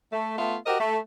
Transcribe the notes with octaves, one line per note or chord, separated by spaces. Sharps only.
A3
A3 B3 F4 E5
F#4 G4 A#4 C5 D#5
A3